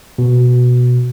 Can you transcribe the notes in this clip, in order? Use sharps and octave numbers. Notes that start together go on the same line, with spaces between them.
B2